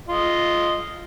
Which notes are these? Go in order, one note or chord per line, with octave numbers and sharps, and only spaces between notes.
F4 D#5